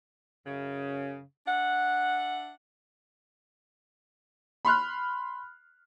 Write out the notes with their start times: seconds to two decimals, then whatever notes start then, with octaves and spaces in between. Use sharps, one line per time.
0.46 F#2 C#3
1.47 D4 E5 F#5
4.65 B5 C6 F6 F#6